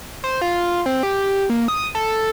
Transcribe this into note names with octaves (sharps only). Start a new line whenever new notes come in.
C5
F4
C4
G4
A#3
D#6
A4